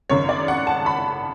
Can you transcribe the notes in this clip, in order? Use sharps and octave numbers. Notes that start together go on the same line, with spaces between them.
G#1 F#2 C#3 C#5
D5
F#5
A5
B5